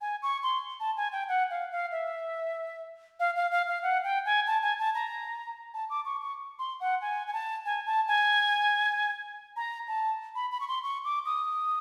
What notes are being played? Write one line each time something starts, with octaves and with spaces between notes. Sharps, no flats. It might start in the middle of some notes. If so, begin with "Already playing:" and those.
G#5
C#6
C6
A5
G#5
G5
F#5
F5
F5
E5
F5
F5
F5
F5
F#5
G5
G#5
A5
G#5
A5
A#5
A5
D6
C#6
C#6
C6
F#5
G#5
G#5
A5
G#5
A5
G#5
A#5
A5
B5
B5
C#6
C6
C#6
D6
D#6